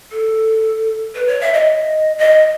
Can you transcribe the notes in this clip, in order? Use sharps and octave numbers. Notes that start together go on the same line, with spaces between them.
A4
B4
C#5
E5
D#5
D#5